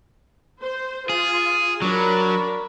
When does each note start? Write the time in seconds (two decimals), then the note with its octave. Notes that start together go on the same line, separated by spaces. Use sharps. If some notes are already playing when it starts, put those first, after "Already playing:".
0.61 C5
1.10 F4 G#4
1.82 F#3 D4 A#4 B5